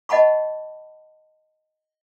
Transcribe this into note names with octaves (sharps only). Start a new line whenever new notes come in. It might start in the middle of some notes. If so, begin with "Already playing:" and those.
D#5 F#5 A5 B5 C#6